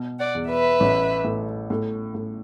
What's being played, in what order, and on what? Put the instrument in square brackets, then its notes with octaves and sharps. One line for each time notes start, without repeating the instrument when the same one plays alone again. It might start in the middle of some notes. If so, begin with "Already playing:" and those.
Already playing: [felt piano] B2
[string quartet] D5 F#5
[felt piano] E2
[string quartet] B4 E5
[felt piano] A1
A2
A2
A2